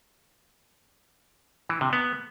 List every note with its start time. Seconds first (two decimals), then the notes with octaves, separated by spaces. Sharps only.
1.69 E3
1.81 C3
1.93 B3